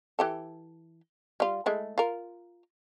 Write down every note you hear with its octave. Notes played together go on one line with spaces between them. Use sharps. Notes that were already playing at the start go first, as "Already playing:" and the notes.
E3 G4 A4
G3 F4
G#3 A3 E4
F4 A#4